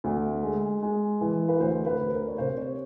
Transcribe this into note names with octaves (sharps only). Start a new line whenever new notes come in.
D2
G#3
G#3
E3
B4
D2 C5
B4
D2
A#4
C#5
C3 C5
C#5